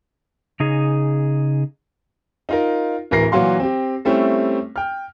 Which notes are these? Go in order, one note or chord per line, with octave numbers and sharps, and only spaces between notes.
C#3 D#4 G#4
D#4 F4 A#4
D1 E3 A#4 A#6 C7
A#2 E3 F#3 F#4 F5 C6
C4 G4
G3 A3 C4 C#4 E4
G5 F6